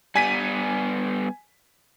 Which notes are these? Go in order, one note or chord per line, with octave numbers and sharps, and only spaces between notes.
G3 B3 G#5 B6 D#7